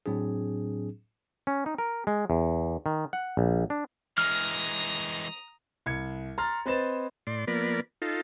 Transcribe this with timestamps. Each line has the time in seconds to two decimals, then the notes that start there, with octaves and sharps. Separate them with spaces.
0.06 A2 F#3 C4 D4 G#4
1.47 C#4
1.66 D#4
1.78 A#4
2.07 G#3
2.30 E2
2.86 D#3
3.13 F#5
3.37 A#1
3.70 D4
4.18 E3 G#3 A#5 D#6 F6
5.86 C2 G#6 C#7
6.38 A#5 C6 F6 A6
6.66 C4 B4 C5 D#5 A6 E7
7.27 A2 D5 C6
7.47 F3 A#3 B3 A#4 D5 B5
8.02 D#4 F4 A4